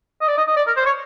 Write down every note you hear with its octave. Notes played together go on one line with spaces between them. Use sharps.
D#5
D5
D#5
D#5
D5
A#4
C5
C#5